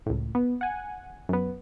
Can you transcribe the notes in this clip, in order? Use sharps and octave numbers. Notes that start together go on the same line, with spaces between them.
C#2 A2
B3
F#5 G#5
F#2 B3